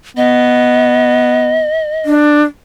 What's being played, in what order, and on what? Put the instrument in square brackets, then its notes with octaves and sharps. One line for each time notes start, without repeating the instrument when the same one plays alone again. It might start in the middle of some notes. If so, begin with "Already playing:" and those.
[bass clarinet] B3 [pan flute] D#5
[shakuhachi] D4